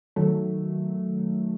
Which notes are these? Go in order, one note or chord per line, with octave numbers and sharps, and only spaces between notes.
D#3 F#3 A3